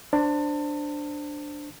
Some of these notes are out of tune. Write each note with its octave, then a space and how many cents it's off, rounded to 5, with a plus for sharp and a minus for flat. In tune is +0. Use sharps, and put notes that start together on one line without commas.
D4 +5 C5 +0 A5 +30